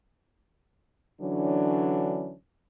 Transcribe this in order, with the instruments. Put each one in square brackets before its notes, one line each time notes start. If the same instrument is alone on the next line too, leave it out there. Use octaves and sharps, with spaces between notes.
[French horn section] D3 E3 F#3 C#4 D4